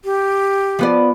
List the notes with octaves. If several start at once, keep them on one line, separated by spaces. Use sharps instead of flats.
G4
F3 B3 D5